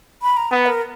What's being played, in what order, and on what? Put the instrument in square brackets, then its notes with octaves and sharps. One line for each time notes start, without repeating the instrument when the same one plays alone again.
[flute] B5
A#5
[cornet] B3 [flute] F#5
[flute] A#4